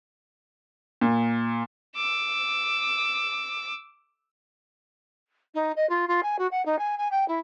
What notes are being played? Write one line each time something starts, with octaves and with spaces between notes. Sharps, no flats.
A#2
D6 E6
D#4
D#5
F4
F4
G#5
F#4
F#5
D#4
G#5
G#5
G5
E4